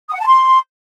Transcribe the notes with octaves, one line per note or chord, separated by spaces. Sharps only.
D#6
F#5
A5
C6